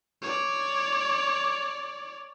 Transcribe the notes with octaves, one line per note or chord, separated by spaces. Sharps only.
C#5 D5